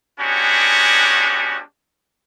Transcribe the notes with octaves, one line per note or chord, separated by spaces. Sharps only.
G#3 B3 C#4 D4 F#4 G4